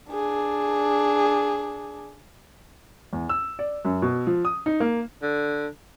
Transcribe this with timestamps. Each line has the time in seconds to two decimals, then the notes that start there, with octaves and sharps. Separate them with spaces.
0.12 D4 G#4
3.13 E2
3.29 E6
3.59 D5
3.85 F#2
4.02 B2
4.27 F3
4.45 D#6
4.66 D#4
4.80 A#3
5.22 D3